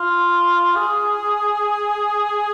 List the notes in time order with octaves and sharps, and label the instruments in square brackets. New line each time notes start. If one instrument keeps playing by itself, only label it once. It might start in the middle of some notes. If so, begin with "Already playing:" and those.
Already playing: [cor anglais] F4
G#4